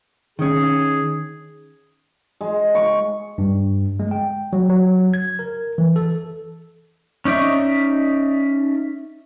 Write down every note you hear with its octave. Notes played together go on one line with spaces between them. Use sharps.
D#3 C#4 G#4
G#3
C#6
G2
G#3
G5
F#3
F#3
G#6
A#4
E3
A4
C#4 D#4 D5 E5 C#6